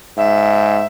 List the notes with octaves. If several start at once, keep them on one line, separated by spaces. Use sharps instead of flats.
G#2 E5